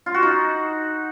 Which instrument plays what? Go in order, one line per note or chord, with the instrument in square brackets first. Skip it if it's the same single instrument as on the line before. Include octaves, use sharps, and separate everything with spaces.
[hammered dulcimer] F4
F#4
D#4